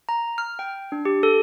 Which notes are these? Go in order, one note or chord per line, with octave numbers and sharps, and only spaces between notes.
A#5
F6
G5
D4
G4
A4